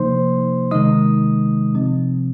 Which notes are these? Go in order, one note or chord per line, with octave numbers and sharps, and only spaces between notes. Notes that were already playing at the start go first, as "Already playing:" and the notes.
Already playing: C3 F3 A#3 D#4 C5 C6
C3 D#3 G#3 D#4 D#5 D#6
C3 F3 C4